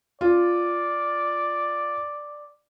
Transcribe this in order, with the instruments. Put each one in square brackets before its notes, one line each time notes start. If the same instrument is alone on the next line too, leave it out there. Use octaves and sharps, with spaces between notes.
[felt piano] F4 [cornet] D5